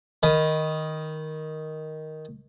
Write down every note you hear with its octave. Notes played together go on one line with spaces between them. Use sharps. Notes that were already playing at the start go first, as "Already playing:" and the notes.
D#3 B4